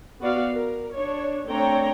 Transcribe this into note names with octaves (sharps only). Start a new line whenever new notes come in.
B3 F#4 D5 F5
A#4
D4 C#5
A3 C4 D4 C#5 G5 A#5